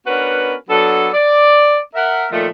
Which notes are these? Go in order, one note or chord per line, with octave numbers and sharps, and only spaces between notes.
B3 C#4 D4 F#4 A#4 B4
F#3 B3 D4 A4
D5
A#4 E5 F#5
A#2 D#3 F3 A3